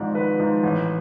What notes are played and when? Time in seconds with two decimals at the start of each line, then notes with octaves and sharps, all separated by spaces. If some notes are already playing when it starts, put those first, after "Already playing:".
Already playing: G#1 G#2 F3 D5
0.15 G#1 B4
0.39 G#2 F3
0.63 A1